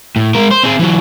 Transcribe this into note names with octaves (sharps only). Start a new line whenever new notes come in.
A2
G#3 A#4
C5
C4 G#4
E3 F#3